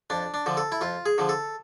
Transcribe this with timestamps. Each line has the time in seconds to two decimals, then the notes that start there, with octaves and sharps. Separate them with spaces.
0.10 F2 D4
0.34 D4
0.46 D3 F3
0.57 A4
0.72 E4
0.81 F2 F4
1.06 G#4
1.18 D3 F3
1.29 A4